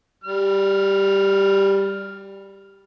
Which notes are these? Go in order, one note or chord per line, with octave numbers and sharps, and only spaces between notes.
G3 F6